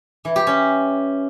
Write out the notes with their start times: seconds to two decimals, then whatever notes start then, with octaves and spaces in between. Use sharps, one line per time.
0.25 E3
0.36 G4
0.47 C#4